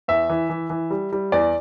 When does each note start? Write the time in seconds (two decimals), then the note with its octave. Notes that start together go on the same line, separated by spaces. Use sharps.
0.08 E2 E5
0.29 E3
0.50 E3
0.70 E3
0.91 G3
1.12 G3
1.32 E2 D5